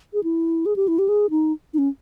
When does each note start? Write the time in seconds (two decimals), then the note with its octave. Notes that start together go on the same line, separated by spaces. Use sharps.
0.14 G#4
0.24 E4
0.66 G#4
0.76 G4
0.88 E4
0.99 G4
1.09 G#4
1.30 D#4
1.74 D#4
1.78 C#4